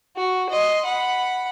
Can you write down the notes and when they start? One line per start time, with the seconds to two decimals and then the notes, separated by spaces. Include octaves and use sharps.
0.17 F#4
0.49 D#5 C6
0.85 F#5 B5